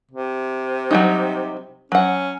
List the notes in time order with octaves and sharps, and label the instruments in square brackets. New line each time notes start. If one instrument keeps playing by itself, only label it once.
[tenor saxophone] C3
[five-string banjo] F#3 G3 D#4
[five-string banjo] F#3 F#5 [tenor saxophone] C#4